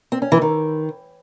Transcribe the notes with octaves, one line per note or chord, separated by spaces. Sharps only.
C4
C#4
E3
D#3